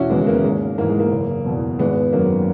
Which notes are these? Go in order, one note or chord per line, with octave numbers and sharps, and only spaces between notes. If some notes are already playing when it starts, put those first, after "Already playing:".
Already playing: E1 C#4 E4 F#4
D#2 C#3 E3 G#3 B3
G#3
A#3
G#1 G#3
G#2 E3 A#3
G#3
A#3
F#1
E2 B2
G#1 G#3 B3
F#2 D#3 F#3 A#3